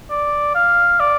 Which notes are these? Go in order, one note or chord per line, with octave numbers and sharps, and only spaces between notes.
D5
F5
D5